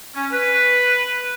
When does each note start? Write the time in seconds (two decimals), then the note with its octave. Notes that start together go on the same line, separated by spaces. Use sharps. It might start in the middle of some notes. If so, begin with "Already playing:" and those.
0.15 C#4
0.32 B4